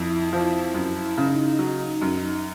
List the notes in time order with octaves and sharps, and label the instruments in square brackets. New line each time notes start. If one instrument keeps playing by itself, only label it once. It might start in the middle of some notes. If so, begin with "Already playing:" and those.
Already playing: [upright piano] F2 [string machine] E4
[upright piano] F3
[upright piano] F#2 [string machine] E4
[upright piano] C#3 [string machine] D#4
[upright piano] F#3
F#2